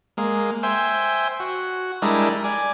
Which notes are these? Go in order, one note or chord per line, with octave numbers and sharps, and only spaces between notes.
G#3 A#3
C5 E5 G5 G#5
F#4
G3 G#3 D4 E4 A#4 D#5
D5 G#5